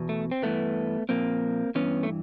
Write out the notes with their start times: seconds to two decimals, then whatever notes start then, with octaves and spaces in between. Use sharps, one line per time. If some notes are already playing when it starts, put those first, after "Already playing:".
Already playing: E2 B2
0.09 A3
0.31 C4
0.42 G2 E3 A3 B3
1.09 A#2 F3 A#3 C4
1.75 G2 E3 B3 C#4
2.03 A3